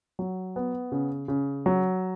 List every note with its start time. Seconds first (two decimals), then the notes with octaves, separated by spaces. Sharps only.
0.19 F#3
0.56 B3
0.92 C#3
1.28 C#3
1.66 F#3